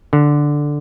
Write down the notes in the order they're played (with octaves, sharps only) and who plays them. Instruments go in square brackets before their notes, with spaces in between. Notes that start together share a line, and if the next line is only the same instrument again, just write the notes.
[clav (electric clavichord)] D3